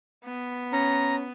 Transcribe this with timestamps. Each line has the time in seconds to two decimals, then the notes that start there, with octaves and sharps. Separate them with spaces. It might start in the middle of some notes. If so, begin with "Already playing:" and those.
0.25 B3
0.73 C#4 A#5